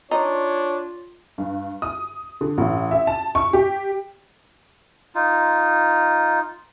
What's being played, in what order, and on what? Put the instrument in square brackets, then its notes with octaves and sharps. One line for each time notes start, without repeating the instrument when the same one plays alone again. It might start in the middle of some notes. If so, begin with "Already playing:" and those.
[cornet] D4 [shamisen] D#4 [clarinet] F4 [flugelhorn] C#5
[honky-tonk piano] G2
D#6
D3
A1
E5
A5
C#6
G4
[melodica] D#4 F4